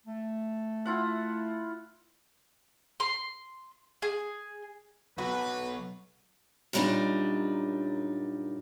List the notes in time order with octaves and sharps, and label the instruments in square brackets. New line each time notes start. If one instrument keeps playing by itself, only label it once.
[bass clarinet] A3
[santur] E4 F4 F#5
[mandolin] C6
G#4
[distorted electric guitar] B1 [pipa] F#4 [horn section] B4
[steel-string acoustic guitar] F#2 A#2 G3 B3 D4 D#4